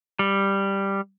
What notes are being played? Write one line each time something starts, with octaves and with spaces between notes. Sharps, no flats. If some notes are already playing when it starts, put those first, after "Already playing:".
G3